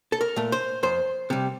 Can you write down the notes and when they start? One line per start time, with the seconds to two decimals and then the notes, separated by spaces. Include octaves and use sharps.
0.12 A4
0.21 A#4
0.36 A#2 A3
0.52 C5
0.83 F2 C5
1.30 C3 G3